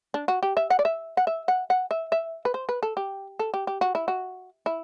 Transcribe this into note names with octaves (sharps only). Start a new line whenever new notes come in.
D4
F#4
G4
E5
F#5
D5
E5
F#5
E5
F#5
F#5
E5
E5
B4
C5
B4
A4
G4
A4
G4
G4
F#4
E4
F#4
E4